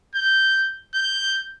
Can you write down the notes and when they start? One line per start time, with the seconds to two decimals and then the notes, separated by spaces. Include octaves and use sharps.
0.15 G6
0.94 G6